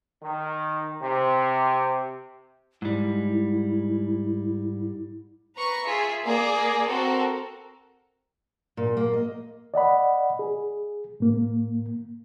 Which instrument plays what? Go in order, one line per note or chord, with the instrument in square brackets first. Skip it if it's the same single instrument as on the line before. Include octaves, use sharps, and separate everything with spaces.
[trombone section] D#3
C3
[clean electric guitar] G#2 G3 [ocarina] E4
[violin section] B4 A#5 C#6
F4 G#4 E5
A#3 G#4 D5
C4 F#4 A4 A#4
[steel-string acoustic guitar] A#2
A#3
D#5
[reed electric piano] D5 D#5 F#5 B5
G#4
A2 A#3